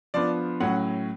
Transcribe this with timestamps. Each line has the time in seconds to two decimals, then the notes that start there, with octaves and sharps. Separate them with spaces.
0.14 F3 B3 D4 D5
0.60 A2 F#3 C#4 F#5